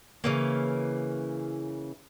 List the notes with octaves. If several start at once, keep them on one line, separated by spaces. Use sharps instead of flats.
C#3 E3 A#3